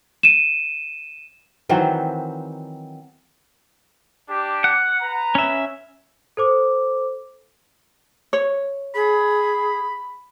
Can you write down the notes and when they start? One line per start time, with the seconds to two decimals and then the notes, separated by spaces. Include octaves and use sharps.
0.23 D#7 E7
1.69 D#3 E3 F#3 C4
4.29 D4 G4
4.64 F#5
5.01 B4 A#5
5.35 C#4 E5
6.37 A4 C5 D6
8.33 C#5
8.95 G#4 B5